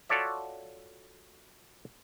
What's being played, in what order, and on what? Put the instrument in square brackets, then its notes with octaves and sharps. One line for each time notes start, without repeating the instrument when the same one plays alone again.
[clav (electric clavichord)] F4 F#4 A4 C#5 D5 E5